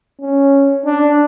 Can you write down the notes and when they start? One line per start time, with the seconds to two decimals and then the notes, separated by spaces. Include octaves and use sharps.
0.21 C#4
0.85 D4